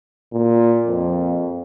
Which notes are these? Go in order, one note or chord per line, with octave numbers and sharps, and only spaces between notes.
A#2
F2